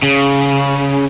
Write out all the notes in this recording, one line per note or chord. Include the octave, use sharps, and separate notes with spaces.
C#3